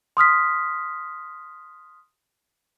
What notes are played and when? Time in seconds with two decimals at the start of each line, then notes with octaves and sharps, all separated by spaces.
0.17 C6 D#6 F6 B6